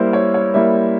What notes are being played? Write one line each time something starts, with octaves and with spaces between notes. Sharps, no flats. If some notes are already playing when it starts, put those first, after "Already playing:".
Already playing: G3 A#3 E4 C5
C#5
C#5
G3 A#3 E4 E5